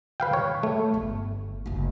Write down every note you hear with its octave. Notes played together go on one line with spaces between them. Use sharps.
B4 F5 G5
C#5
A3
G1
F#1 F#3